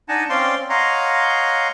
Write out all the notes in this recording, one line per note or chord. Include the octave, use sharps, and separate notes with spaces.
D4 D#4 D#5 F#5 G#5 A5
C4 C#4 D5 F5 G5 C6
C#5 D#5 F5 F#5 A#5 C6